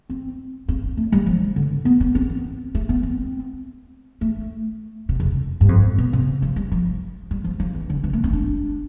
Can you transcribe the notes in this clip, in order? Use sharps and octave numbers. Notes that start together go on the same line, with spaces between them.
C4
C4
A3
G3
F3
D3
B3
B3
C4
C4
A3
B3
C4
A3
C3
F2
G2
F2
B2
C3
F3
G3
F3
G3
F3
F3
E3
D3
E3
A3
C4
D4